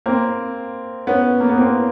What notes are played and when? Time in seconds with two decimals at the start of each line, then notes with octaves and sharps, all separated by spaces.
0.06 A#3 C4
1.07 B3 C#4
1.40 A#3
1.49 B3
1.58 A#3 C4